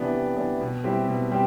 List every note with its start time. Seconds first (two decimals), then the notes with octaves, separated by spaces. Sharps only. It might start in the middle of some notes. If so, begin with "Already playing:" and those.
Already playing: C3 E3 B3 D4
0.13 C3
0.37 E3 B3 D4
0.61 B2
0.84 G3 C4 E4 G4
1.08 B2
1.31 G3 C4 G4